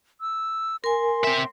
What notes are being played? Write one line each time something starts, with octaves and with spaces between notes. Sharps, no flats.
E6
A#4 G#5 C6
C4 E5